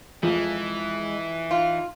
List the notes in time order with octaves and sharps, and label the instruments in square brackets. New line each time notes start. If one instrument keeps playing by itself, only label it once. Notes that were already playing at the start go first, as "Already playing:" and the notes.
[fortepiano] F2 F3 [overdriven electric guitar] E3 [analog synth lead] G#3
[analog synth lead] D#4 [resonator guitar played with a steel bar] F4